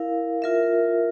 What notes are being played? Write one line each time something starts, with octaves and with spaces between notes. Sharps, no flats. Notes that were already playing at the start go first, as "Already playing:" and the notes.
Already playing: E4 A#4 F5
F4 A#4 E5